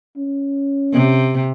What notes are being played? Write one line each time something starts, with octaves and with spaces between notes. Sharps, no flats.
C#4
C3